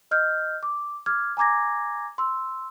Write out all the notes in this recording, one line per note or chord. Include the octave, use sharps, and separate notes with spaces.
D#5 F6 G6
D6
D6 F6 G#6
G#5 A#5 D6 G#6 A#6
C6 E6